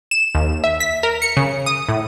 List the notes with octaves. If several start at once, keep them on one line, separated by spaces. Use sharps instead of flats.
E7
D#2
E5
B6
A#4
C#7
C#3
D#6
A2